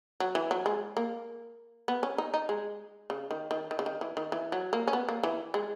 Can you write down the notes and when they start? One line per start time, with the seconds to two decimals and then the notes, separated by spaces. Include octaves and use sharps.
0.20 F#3
0.35 E3
0.51 F#3
0.66 G#3
0.97 A#3
1.88 B3
2.03 C#4
2.18 D#4
2.34 D#4
2.49 G#3
3.10 C#3
3.31 D#3
3.51 D#3
3.71 D#3
3.79 C#3
3.86 D#3
4.01 E3
4.17 D#3
4.32 E3
4.52 F#3
4.73 A#3
4.88 C#4
4.93 B3
5.09 A#3
5.23 E3
5.54 G#3